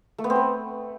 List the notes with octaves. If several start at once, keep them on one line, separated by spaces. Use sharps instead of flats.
A3
B3
C4
B4